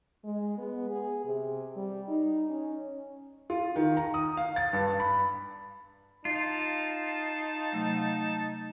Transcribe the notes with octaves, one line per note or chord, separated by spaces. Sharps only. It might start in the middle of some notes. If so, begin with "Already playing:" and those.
G#3
B3
G#4
C3
G3
D#4
C#4
F4
D#3
A#5
D#6
F5
A6
G2
B5
D#4 F4 A5
C3 F#3 A3